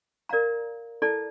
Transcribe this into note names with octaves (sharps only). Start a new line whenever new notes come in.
A#4 D5 F5 A#5
E4 A4 D5 A5